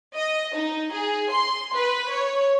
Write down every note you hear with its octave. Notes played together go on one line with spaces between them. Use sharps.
D#5
D#4
G#4
C6
B4
C#5